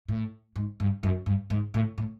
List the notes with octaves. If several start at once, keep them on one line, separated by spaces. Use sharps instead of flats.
A2
G#2
G2
F#2
G2
G#2
A2
A2